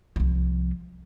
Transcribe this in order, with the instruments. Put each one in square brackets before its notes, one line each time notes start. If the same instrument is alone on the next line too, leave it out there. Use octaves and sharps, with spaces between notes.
[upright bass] C2 F3